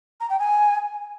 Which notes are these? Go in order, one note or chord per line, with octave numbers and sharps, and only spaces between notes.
A#5
G5
G#5